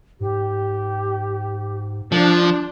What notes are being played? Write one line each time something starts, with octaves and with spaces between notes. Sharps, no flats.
G#2 G4
F3 D4